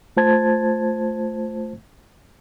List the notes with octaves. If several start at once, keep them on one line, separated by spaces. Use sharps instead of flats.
A3 F4 C5 A5 G#6 A6